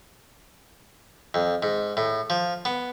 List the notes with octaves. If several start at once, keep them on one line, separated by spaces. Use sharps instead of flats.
F2
G#2
A2
F3
B3